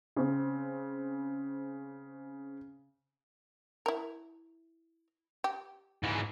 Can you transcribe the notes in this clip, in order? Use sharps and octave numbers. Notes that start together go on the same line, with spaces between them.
C#3 C4
E4 A#4
G4
G#2 E3